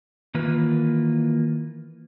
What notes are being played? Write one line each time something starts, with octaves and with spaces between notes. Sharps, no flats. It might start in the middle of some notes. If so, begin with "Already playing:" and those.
D#3 E3 A#3 F4 B4